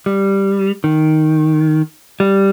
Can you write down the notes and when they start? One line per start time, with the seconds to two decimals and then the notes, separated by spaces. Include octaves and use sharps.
0.06 G3
0.84 D#3
2.20 G3